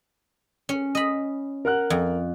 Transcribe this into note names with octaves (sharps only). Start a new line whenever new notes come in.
C#4
D#5 B5
A#4 F#5 F#6
F2